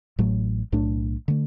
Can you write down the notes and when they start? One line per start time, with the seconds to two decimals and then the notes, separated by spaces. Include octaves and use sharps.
0.19 A1 A2 F#3 A3
0.72 B1 A2 A3 D4
1.28 D3 A3